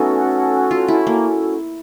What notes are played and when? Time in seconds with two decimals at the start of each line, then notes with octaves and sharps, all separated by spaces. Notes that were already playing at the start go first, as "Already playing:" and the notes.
Already playing: A3 B3 C#4 D#4 F#4 A4
0.71 F4
0.88 E4
1.07 A#3